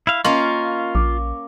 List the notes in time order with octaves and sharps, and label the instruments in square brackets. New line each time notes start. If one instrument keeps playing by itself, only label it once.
[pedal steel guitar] E4 F5
[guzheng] A#3 C#4 [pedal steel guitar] F4 [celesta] D#5 C6 C#6
[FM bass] A#1 [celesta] D6